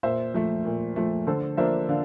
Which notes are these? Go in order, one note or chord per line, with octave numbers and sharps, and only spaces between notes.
A#2 C5 E5
F3 A3
A#2
F3 A3
D3 A4 C5
F3 A#3 D4 C5 E5
D3 D5 F5